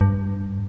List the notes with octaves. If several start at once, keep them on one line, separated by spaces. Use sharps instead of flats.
G2